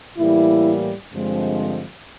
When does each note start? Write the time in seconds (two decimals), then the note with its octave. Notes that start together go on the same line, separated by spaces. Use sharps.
0.16 A2 E3 G3 A#3 E4
1.11 G2 D3 F3 G#3 C4